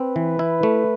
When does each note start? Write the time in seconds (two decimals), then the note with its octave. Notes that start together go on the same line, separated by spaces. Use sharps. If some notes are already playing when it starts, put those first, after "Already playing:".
Already playing: C4 B4
0.16 E3
0.39 E4
0.63 A3